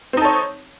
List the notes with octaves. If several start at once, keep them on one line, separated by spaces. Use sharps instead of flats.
C4 D#4 A4 C#5